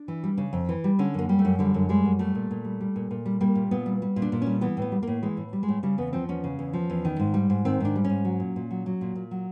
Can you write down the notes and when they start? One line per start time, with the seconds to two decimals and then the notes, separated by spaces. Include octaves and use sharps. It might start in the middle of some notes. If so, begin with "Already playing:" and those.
Already playing: D4
0.08 E3
0.24 G3
0.38 C#3
0.53 F2
0.69 E3
0.84 G3
0.99 D3 C#4
1.14 F#2 A#3
1.29 G3
1.39 A3
1.45 F#2
1.59 D3 G3
1.74 F#2
1.89 G3 G#3
2.05 F#2
2.19 G3 A3
2.35 A#2
2.51 A#2
2.65 G3
2.81 G3
2.96 A#2
3.11 A#2
3.26 G3
3.41 G3 A#3
3.55 A#2
3.71 A#2 B3
3.86 G3
4.02 G3
4.16 A#2
4.22 D4
4.32 A#2
4.42 G3 C#4
4.61 E3 B3
4.77 A2 B3
4.92 G3
5.03 A2 A#3
5.23 E3 G#3
5.37 A2
5.53 G3
5.63 G#3
5.68 A2
5.83 C#3 G3
5.98 E2 B3
6.13 F3 C4
6.29 E2 C#4
6.44 C#3
6.59 E2
6.73 F3
6.90 E2
7.05 D#3
7.19 G#2
7.34 G3
7.50 G#2
7.65 D#3 C4
7.80 G#2 D4
7.96 G3
8.04 C#4
8.09 G#2
8.25 F#3
8.40 A#2
8.56 A#2
8.71 F#3
8.86 F#3
9.01 A#2
9.15 A#2
9.31 F#3